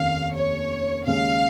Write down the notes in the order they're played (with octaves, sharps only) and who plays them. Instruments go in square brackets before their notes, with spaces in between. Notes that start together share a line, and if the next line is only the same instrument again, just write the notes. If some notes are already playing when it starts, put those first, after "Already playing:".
Already playing: [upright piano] F1 D#2 D#3 C#4 [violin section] F5
[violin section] C#5
[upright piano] D#2 C#3 G#3 C#4 G#4 [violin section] F5